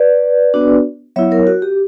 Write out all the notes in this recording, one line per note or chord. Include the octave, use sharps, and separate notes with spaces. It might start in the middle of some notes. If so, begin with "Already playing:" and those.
Already playing: B4 D5
B3 D4 F#4
F#3 B3 E4 C#5 E5
A#4 C#5
F#4
G4